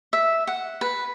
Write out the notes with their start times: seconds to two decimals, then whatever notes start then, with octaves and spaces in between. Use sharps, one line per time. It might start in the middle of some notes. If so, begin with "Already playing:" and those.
0.13 E5
0.47 F#5
0.81 B4